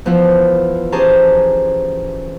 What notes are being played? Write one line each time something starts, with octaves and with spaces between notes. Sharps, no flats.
E3 F3 B3 E4 F4
C#4 G4 G#4 C5 A5 A#5